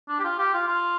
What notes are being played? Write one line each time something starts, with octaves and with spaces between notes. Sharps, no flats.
D4
G4
F4
G4
F4
F4